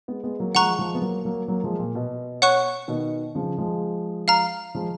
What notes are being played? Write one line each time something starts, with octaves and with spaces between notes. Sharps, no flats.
G#3 B3
G#3 B3
F#3 A#3
F3 G#3 F#5 A#5 C#6 F#6
F3 G#3
B3
F#3 A#3
F#3 A#3
F#3 A#3
F3 G#3
A#2
B2
C#5 F#5 C#6 F#6
B2 D#3
C#3 F3
F3 G#3
F5 A#5 F6
F3 G#3